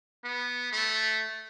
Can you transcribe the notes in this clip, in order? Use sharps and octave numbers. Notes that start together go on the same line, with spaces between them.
B3
A3